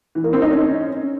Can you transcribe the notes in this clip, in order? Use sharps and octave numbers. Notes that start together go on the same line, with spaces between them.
E3
A#3
C4
D#4
C#4